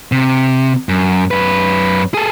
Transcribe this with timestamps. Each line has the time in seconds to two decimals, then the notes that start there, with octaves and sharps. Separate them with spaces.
0.12 C3
0.89 F#2
1.31 F#2 B4
2.14 G#4 A4